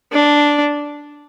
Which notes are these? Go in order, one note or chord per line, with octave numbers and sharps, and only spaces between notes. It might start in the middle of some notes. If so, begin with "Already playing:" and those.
D4